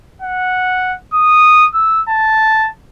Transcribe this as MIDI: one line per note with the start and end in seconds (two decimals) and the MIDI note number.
0.22 0.95 78
1.14 1.67 87
1.74 2.01 88
2.09 2.69 81